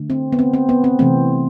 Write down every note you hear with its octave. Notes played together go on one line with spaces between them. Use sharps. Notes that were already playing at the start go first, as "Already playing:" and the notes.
Already playing: D3 A3
C4
B3
C4
C4
B3
C4
C3 E3 A3 C4